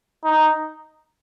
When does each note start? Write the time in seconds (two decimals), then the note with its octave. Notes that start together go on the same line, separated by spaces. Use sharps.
0.25 D#4